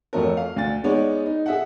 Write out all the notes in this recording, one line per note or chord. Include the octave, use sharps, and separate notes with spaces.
F2 F#3 A3 A4 A#4
F5
D2 A6
G#3 B3 D#4 C#5 D5
D#4
G#4 E5 F#5